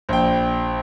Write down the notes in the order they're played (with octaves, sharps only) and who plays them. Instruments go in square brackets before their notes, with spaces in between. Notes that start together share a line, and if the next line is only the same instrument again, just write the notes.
[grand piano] A#1 G5